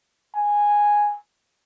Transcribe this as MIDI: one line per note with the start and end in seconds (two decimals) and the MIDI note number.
0.35 1.17 80